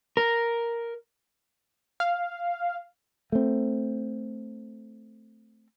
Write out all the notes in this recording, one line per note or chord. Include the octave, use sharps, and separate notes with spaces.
A#4
F5
A3 C4